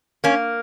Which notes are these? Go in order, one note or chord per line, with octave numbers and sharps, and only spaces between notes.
A#3 C#4